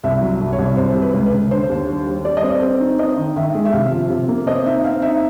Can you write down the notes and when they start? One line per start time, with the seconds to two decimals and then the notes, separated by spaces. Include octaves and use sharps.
0.03 C2 E5
0.21 F#3
0.40 C2
0.53 C#5
0.58 C2
0.77 C3 C5
0.96 C3
1.02 B4
1.14 C#2
1.26 B4
1.32 C#2
1.51 D3 C5
1.69 D#2
1.88 G3
2.07 G3
2.25 G3 D5
2.37 D#5
2.43 C4
2.49 D5
2.62 C4
2.80 D#4
2.99 C4 D#5
3.17 D#3
3.36 D#3 E5
3.55 G#3
3.65 E5
3.72 C3 F5
3.92 F3
4.10 C3
4.28 A#3
4.47 C4 D#5
4.65 D#4 E5
4.84 C4 F5
5.02 D#4 E5